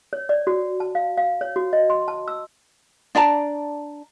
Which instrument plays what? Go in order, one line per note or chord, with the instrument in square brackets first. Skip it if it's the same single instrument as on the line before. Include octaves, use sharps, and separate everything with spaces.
[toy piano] C#5
D5
F#4
A5
F5
F5
C#5
F#4
D#5
C6
A5
E6
[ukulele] D4 D5 A5 A#5